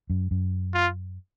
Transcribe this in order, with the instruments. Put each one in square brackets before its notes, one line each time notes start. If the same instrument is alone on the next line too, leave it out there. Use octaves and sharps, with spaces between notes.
[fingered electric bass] F#2
F#2
[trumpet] F4